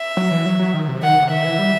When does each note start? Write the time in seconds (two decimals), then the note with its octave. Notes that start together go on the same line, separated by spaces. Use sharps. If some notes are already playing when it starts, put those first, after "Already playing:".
Already playing: E5
0.17 F#3
0.31 E3
0.46 F#3
0.59 F#3
0.74 D#3
0.88 C3
1.02 D#3 F#5
1.22 C3
1.30 D#3 E5
1.45 E3
1.59 G3